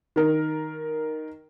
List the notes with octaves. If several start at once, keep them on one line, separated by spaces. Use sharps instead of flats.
D#3 A#4